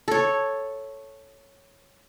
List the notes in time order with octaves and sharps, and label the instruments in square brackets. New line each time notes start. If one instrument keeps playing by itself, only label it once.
[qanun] A4 C#5